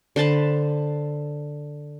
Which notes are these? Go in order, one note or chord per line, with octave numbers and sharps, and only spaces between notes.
D3 C5 A5 B5